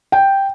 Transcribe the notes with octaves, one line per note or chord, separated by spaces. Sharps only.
G5